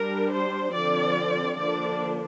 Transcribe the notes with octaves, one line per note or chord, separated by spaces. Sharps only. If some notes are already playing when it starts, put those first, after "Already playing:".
Already playing: G3 D4 A#4
C5
D3 F3 C4 D5
D3 F3 A#3 D4 D5